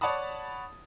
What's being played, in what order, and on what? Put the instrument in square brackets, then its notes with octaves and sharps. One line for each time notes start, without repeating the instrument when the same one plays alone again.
[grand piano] C#5 D5 F#5 A5 B5 D#6